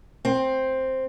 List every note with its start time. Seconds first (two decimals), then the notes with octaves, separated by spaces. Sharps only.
0.25 C4